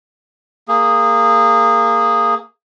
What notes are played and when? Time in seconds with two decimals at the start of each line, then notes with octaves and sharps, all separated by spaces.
0.68 A#3 G#4